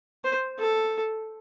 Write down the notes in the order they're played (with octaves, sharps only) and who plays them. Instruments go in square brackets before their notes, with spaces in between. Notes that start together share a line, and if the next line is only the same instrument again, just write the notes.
[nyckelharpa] C5
A4